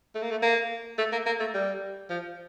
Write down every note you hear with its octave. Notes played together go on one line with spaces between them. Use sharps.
A3
A#3
A3
A#3
A3
A#3
A#3
A3
G3
F3